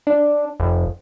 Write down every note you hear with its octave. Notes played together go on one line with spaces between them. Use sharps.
D4
F1